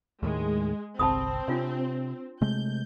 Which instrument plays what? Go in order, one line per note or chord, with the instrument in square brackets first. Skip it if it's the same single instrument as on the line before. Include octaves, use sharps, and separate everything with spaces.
[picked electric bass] D#2 A2 D#3 [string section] G#3
[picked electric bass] G1 C2 [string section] C4 [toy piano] A5 B5 D#6
[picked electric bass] C3 [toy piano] D4 F4 C#5
[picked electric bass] C3 G#3 A3 [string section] G6